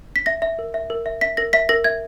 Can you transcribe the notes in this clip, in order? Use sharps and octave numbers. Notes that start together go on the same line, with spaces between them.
B6
E5 A#6
E5
A#4
E5
A#4
E5
E5 B6
A#4 A#6
E5 B6
A#4 A#6
E5 G#6